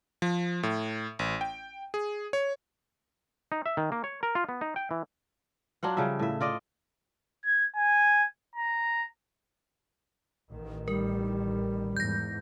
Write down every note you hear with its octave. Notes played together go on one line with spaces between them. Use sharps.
F3
A2
A1
G5
G#4
C#5
D#4
E5
D#3
A#3
C#5
A#4
F4
B3
D#4
G5
E3
F#3 D4 F4 F#5
C#3 F3 G3 E5
A2 E5
F4 D5 D#5
G#6
G#5
A#5
A1 D#3
G3 A#4
E2 G#2 G6 A#6